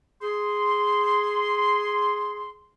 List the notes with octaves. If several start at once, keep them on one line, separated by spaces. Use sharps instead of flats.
G#4 C6